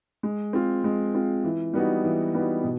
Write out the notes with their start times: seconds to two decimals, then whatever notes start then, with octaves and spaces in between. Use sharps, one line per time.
0.23 G#3
0.53 C4 F4
0.84 G#3
1.14 C4 F4
1.44 E3
1.73 G3 B3 D#4 F#4
2.04 E3
2.34 G3 B3 D#4 F#4
2.64 B2